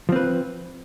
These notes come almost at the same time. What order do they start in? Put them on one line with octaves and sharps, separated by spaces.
F3 C4 B4